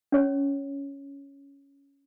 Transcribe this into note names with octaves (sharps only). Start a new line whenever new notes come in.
C#4 C#5